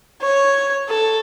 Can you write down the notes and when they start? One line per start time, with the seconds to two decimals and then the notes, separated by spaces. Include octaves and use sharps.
0.22 C#5
0.89 A4